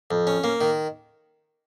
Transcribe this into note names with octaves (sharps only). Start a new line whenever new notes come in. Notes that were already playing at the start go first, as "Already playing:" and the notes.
F2
C#4
A#3
D#3